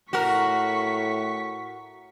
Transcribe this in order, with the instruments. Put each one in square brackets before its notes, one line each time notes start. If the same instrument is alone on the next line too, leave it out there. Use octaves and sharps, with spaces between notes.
[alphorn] A2 [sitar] F#4 A#4 [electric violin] C#6 B6